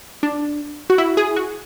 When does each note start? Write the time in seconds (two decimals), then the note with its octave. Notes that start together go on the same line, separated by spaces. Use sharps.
0.23 D4
0.90 F#4
0.98 E4
1.17 G#4
1.36 F#4